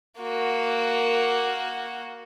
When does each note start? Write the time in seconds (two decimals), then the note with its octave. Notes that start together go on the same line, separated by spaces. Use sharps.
0.18 A#3 F#4